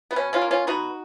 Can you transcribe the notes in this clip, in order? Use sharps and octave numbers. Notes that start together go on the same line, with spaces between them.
B3
B2 C#4
C#4 F4
A#3
C#4 F4
B2 D#4 F#4